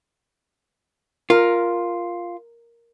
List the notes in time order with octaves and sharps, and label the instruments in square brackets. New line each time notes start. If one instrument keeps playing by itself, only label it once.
[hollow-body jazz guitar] F4 [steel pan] A#4